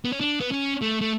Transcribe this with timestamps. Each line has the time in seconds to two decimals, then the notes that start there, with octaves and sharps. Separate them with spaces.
0.05 B3
0.12 C#4
0.21 D4
0.40 B3
0.52 C#4
0.82 A3
1.01 A3